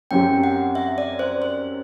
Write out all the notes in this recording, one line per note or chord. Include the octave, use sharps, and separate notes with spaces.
F#2 F#3 C4 G4 G5
F#5
E5
D5
C5
C5